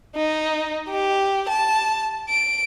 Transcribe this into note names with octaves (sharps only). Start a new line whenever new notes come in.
D#4
G4
A5
D7